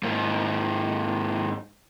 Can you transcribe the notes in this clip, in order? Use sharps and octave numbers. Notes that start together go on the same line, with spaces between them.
G#2 A#3